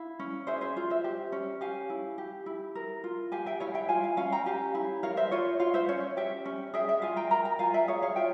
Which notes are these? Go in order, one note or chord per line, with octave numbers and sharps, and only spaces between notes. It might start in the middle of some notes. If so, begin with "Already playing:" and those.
Already playing: E4 F5
C#4
G#4 C5 E5
C5 E5
F4
C5 E5
G4
C#4
G4 F5 G#5
E4
G4
E4
A#4
F4
G4 F5 G#5
E5 G5
E4 C#5 F5
E5 G5
F4 F5 G#5
F5 G#5
C#4 F5 G#5
G5 A#5
G4 F5 G#5
E4
A#4 C#5 F5
C5 E5
F4 C#5
F4 C#5 F5
C5 E5
C#4 C#5
G4 E5 G5
C#4
G#4 E5 G5
E5 G5
F4 F5 G#5
G5 A#5
A#4 G5 A#5
G5 A#5
F4 F5 G#5
E5 G5
G#4 C#5 F5
C#5 F5
F4 E5 G5